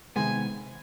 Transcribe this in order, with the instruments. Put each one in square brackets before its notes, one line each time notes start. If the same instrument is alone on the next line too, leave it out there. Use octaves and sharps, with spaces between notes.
[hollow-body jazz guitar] C3 D#3 G#3 B3 [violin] G#5